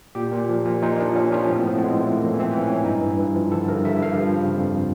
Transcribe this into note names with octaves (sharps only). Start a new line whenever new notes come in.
A#2 G4
A#2
F3
A#2
A#2 D#4
F3 D4
A#2 C#4
F3 C#4
A2 C4
A2 B3
A2 G#3
A2 A3
E3 A#3
E3
C4
E3
C#4
E3
G2 D#4
G2
G2
F3
D3 A4
G2 A#4
G2 E5
G2 F5
F3
C#3
F2